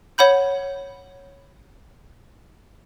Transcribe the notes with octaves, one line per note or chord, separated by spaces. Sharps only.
C#5 F#5 B5 G6